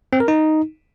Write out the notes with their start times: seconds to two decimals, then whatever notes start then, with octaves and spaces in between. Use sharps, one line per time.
0.13 C4
0.20 A#4
0.28 D#4